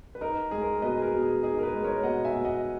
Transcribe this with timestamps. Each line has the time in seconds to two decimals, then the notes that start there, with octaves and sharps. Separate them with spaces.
0.15 B4
0.21 D#4 A#4
0.51 G#3 G#4
0.62 A#4
0.82 B2 B4 D#5
0.98 G#4
1.02 A#4
1.13 B2
1.23 G#4
1.43 D#4 G#4
1.59 A#4
1.63 G#4 B4
1.73 G#3
1.84 A#4 C#5
2.03 B2 D#5 F#5
2.24 E5 G#5
2.35 B2
2.45 D#5 F#5